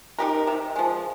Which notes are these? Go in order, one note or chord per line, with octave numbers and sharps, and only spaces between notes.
D#4 G4 A#4
C3
F3 G#3